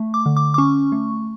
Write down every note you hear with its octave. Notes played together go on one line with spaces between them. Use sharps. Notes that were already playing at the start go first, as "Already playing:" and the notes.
Already playing: A3
D6
D3
D6
D6
C#4 C#6
A3